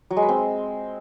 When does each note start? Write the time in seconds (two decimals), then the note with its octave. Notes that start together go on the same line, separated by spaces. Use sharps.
0.10 F#3
0.16 G#3
0.23 B4
0.29 C4